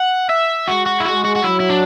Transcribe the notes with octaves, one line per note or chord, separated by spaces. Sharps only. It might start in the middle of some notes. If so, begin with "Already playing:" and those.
Already playing: F#5
E5
G#3 F#4
F#4
E4
G#3 F#4
F#4
F#4
F#3 E4
E4
D4